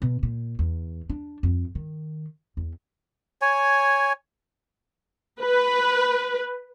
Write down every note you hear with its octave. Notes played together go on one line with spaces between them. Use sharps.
B2
A#2
E2
D4
F2
D#3
E2
C#5 G#5
B4